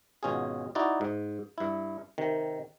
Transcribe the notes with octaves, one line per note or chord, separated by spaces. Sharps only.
G#1 B2 C#4 F4 G#4
D#4 E4 F#4 D5
G#2
G2 E4
C3 D#3